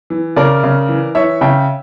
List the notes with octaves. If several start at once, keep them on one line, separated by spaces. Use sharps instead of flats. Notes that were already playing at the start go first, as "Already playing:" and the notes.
E3
C#3 A#4 D5
C#3
E3
E3 C#5 E5
C#3 E5 G5